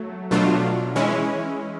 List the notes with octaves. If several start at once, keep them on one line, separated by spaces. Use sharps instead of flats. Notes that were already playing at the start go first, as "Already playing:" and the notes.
Already playing: F#3 A3
B2 F#3 A3 D4 F4
E3 G#3 C#4 E4